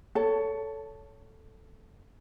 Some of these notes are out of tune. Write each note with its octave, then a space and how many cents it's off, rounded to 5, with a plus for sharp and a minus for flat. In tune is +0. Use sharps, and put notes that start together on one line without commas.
A4 +0 C#5 +15 A5 +20